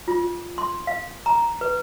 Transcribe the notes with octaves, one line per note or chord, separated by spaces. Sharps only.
F4
C6
F5
A#5
B4